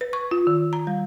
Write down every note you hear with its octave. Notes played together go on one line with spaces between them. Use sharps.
B4
C#6
F4
D#3
A#5
G3